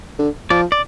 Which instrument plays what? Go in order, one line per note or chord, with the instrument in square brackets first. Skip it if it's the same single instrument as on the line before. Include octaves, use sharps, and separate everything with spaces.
[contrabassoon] D3
[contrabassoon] F3 [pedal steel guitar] D5
[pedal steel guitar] D5